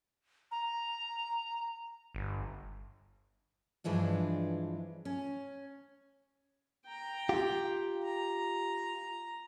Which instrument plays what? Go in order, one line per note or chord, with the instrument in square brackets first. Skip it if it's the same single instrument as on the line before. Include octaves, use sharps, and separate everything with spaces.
[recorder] A#5
[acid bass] G1
[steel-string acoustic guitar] G2 E3 F3 G#3 D4
C#4
[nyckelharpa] G5 A#5
[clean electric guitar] F4 G4
[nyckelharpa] A#5